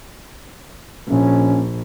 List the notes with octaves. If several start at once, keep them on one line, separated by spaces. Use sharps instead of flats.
A#1 C#4